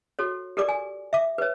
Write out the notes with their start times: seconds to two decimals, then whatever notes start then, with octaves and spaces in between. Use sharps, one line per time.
0.19 F#4 A4 C#5
0.57 G4 A4 A#4 D5 D6
0.68 G#5
1.13 E5 D6
1.38 B4 C#5